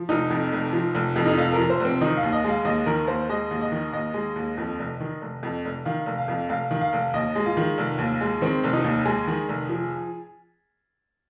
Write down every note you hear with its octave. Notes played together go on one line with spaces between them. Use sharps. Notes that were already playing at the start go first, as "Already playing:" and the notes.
Already playing: F3
F1 D#4
F2
F1
F3
F1
F2
D#4
F1 F4
F3 A#4
C5
F1
C4
D#3 D#4
F5
D#2
D#5
G#3 F5
D#2 D#5
D#3 A#4
D#2 C5
G#3 D#5
D#2
D#5
D#3
D#2 D#5
G#3
D#2
F2
F1
D#3
F1
F2
F1
D#3 F5
F1
F5
F2
F1 F5
D#3
F5
F1
D#2 D#5
G#3
F4
D#3
F1
D#2
G#3
D#3 C4
F1
D#4
D#2
G#3 G#4
D#3
F1
F3